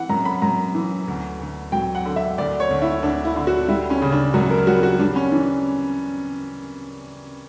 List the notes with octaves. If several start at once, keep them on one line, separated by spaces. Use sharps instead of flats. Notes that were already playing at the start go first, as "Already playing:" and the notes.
Already playing: E3 F#5
F#2 A#5
B5
F#2 A#5
E3
D2
D2
F#3 G5
F#5
D3
E5
D2 D5
C#5
D2
E4
D2 D4
E4
D3
F#4
G3 E4
C#4
C#3
D4
F#2 F#4
A#4
G3 F#4
F#4
G3 D4
C#4
E3 D4